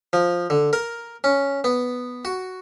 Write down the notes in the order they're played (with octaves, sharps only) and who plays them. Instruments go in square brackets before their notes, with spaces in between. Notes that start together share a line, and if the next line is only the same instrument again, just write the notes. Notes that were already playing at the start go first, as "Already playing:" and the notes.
[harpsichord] F3
D3
A#4
C#4
B3
F#4